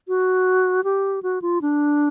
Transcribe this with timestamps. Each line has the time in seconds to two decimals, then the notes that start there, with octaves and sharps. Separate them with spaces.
0.08 F#4
0.84 G4
1.23 F#4
1.42 F4
1.62 D4